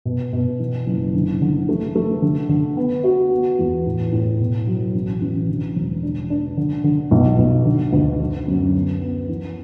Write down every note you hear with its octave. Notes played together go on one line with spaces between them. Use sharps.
B2
B2
E3
F#1
D3
D3
A3
A3
D3
D3
B3
F#4
B3
E2
A2
A2
B2
F#3
A1
A1
D3
E1
D4
D4
D3
D3
B1
B1
D3
D2
D3
F#2
B3
B3
E3